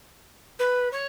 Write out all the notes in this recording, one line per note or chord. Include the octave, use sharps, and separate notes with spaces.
B4
C#5